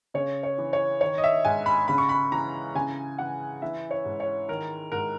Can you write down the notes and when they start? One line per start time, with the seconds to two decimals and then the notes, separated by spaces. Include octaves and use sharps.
0.14 C#3 C#5
0.43 C#5
0.58 E3
0.73 C#5
1.01 D#3 C#5
1.18 D#5
1.24 E5
1.45 G#2 G#5
1.66 B5
1.88 C#3 B5
1.98 C#6
2.09 B5
2.32 E3 A#5
2.75 C#3 G#5
3.18 E3 F#5
3.62 E3 E5
3.91 C#5
4.05 G#2
4.20 C#5
4.48 D#3 A#4
4.92 G#2 A#4